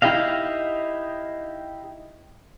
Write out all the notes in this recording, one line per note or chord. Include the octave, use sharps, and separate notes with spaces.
D#4 E4 G4 D#5 F5